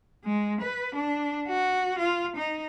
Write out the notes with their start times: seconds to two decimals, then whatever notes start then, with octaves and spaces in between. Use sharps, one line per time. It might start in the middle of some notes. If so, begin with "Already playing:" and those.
0.24 G#3
0.61 B4
0.95 D4
1.48 F#4
1.99 F4
2.36 D#4